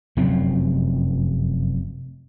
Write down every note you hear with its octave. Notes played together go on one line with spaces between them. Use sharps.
F1 F#2 F#3 C4